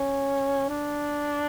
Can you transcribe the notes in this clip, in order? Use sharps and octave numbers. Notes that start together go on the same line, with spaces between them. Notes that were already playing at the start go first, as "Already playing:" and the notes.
Already playing: C#4
D4